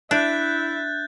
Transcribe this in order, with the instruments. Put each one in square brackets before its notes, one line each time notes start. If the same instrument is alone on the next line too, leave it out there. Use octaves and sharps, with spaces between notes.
[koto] D4 [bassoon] E4 [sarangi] E5 [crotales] F#6 G6 A6